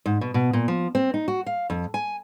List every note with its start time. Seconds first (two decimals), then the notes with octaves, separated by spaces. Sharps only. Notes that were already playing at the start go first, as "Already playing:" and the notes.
0.06 G#2
0.21 B2
0.34 B2
0.53 A#2
0.68 F3
0.95 C4
1.14 D#4
1.28 F#4
1.46 F5
1.70 F2
1.94 G#5